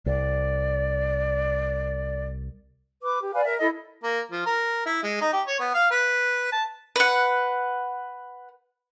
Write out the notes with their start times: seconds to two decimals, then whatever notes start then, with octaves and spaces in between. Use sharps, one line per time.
0.06 C2 D5
3.02 B4 D6
3.22 G4
3.33 B4 D5 F5 G#5
3.44 A#4 E5
3.59 E4 A4 D#5
4.03 A#3
4.31 F3
4.46 A#4
4.86 E4
5.03 G#3
5.21 D#4
5.33 G4
5.47 C#5
5.59 B3
5.74 F5
5.91 B4
6.52 A5
6.96 B4 F#5